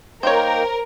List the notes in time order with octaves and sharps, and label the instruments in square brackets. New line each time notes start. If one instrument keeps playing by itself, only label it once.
[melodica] A#3 D#4 G5 [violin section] A#4 [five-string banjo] C5 C#5